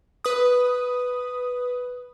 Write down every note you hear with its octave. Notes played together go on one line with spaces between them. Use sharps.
B4 D#6